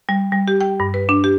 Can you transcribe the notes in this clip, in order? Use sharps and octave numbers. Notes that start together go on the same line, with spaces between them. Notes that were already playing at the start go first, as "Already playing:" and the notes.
G3
G3
G4
G5
G2
B4
D4
G4